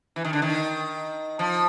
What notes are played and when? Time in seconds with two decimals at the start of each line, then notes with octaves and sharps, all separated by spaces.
0.16 E3
0.25 D#3
0.33 D3
0.42 D#3
1.39 F3